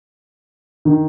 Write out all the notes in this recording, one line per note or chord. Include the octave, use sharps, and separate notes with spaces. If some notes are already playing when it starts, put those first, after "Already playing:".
D#3